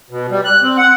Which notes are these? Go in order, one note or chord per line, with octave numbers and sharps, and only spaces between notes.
B2
G3
F#6
C4
F#5